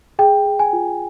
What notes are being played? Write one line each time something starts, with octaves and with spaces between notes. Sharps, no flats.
G#4 G5
G#4
G#5
F4